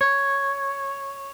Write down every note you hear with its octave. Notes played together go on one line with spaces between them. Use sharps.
C#5